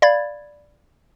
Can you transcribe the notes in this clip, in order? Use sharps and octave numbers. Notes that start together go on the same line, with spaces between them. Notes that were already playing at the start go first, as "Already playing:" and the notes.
D5 F5 B5 G#6 A6